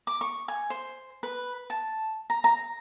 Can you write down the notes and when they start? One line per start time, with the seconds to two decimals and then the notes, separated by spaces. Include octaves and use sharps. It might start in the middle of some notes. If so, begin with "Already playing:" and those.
0.07 D6
0.21 C#6
0.48 G#5
0.70 C5
1.23 B4
1.70 A5
2.30 A#5
2.44 A#5